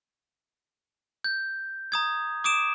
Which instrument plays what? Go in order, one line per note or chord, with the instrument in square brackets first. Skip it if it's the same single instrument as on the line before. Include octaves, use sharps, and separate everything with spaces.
[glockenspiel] G6
A#5 D#6 G#6
D6 D#6 D7 E7